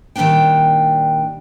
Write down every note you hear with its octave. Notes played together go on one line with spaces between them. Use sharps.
A#2 D#3 F#3 G3 D4 G5